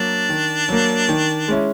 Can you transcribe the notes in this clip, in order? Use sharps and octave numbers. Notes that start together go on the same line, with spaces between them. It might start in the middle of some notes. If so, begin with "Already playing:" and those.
Already playing: F#3 A#3 D4
D#3
F#3 A#3
D#3
G#3 C#4 E4